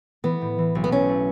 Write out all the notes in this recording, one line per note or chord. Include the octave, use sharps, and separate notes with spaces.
E3 B3
A2
E3
B1
B3
A3 C#4
A3